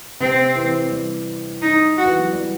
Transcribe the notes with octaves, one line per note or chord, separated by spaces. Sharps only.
C3 C4
E3
G3
D#4
F#4
E3
F#3
G3